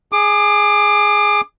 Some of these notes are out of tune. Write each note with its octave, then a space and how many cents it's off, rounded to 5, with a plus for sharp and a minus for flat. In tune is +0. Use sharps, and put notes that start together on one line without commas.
G#4 +0 D6 +30